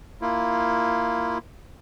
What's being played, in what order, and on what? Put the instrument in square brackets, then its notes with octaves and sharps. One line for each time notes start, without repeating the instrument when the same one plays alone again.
[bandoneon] A#3 E4 F4